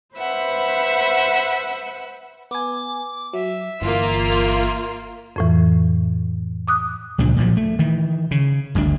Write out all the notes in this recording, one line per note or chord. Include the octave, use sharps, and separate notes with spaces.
B4 C5 E5 F#5
B3 G#5 D6
F#3 E5
G1 E3 A#3 F4
F2 A2 E3
D6 D#6 F#6
C#2 A#2 F3 D4
A#2 F3 F#3
A3
D#3 E3
C#3
G1 D2 D3 D4